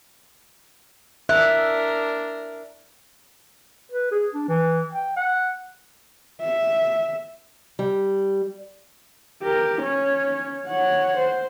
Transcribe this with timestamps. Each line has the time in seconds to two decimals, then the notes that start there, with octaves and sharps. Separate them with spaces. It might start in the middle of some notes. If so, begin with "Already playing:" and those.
1.29 D4 A#4 E5 F#6
3.92 B4
4.11 G#4
4.34 D4
4.48 E3
4.93 G5
5.16 F#5
6.42 E5
7.79 G3
9.44 G4 A#4
9.82 C#4 C#5
10.68 C#5 F#5
11.18 C5